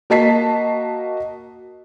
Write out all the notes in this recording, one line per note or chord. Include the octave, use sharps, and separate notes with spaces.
A#3 F#4 D#5 A5 B6 C7